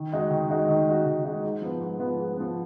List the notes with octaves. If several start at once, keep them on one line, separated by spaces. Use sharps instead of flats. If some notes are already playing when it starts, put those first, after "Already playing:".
Already playing: D#3
G#3 D#4 F#4
D#3
G#3 D#4 F#4
D#3
G#3 D#4 F#4
D#3
G#3 D#4 F#4
G#2
F3 B3
G#2
F3 B3
G#2
F3 B3